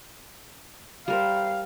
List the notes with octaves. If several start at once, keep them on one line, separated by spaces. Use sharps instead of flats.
G3 A#4 C5 F5